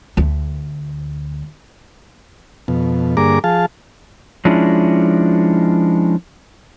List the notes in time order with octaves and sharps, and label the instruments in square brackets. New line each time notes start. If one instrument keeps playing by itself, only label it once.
[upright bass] D2 A3
[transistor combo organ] F2 B2
G2 D3 A#3 G#4 A#5 D6
F3 G#4 F5 A5
[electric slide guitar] F3 G#3 C#4 D4 E4